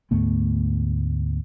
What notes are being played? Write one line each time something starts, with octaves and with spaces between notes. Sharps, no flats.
D2 G#2 A3 B3